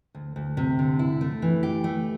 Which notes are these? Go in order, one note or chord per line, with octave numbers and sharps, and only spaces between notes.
D2
D2
C3
D3
E4
A3
E3
G4
A3